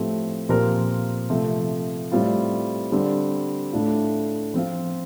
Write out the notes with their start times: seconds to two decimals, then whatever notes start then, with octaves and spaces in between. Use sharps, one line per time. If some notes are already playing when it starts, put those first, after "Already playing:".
Already playing: A2 F3 A3 C4 G4
0.49 A#2 F3 C4 G4 A#4
1.30 C3 F3 A3
2.12 A2 G3 C4 F4
2.92 D3 G3 C4
3.72 A2 A3 D4 F4
4.54 F3 C4 F4